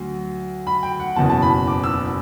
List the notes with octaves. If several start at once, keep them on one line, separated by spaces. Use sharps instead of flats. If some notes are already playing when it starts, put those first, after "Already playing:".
Already playing: D2 F#3
B5
G5
F#5
F#1 E2 B2 A5
A5
B5
D6
E6